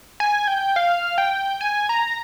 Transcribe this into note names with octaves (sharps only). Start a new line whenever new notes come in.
G#5
G5
F5
G5
G#5
A#5